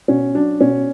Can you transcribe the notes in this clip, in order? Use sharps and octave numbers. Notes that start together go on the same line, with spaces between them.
B2 C#4
F#3 D4
B2 C#4